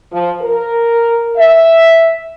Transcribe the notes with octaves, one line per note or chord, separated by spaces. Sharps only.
F3
A#4
E5